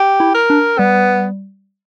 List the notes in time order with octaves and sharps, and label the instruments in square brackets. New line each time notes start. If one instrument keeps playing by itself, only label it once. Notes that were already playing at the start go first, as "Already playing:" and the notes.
Already playing: [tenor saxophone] G4
[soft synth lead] E4
[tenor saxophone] A#4
[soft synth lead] D4
[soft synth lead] G3 [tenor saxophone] B3